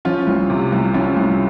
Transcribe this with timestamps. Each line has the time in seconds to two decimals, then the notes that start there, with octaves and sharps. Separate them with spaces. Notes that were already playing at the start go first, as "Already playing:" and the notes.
0.05 F3 C#4 F4
0.27 C2
0.50 C3
0.72 C2
0.94 F3 C#4 F4
1.17 C2